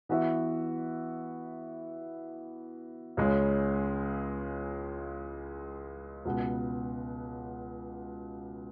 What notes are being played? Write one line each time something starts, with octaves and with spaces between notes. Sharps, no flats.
E3 B3 F#4 E5
C#2 C#3 G#3 C#4
C#2 B2 B3